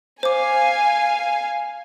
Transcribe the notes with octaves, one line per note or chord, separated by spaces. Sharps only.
C5 F5 G#5 D6